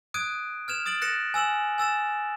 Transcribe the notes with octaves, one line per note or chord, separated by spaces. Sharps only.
D#6 F#6 G#6 D7 D#7
F6 G#6 E7 F7
D#6 A6 D7 F#7
F#6 A6 A#6 C#7 E7
G#5 E6 E7 F#7
G#5 E6 A6 E7